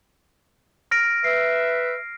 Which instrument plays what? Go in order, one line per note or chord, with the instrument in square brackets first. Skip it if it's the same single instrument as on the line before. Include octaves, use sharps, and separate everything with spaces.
[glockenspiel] F6 A#6 D7
[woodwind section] B4 E5 [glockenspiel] C7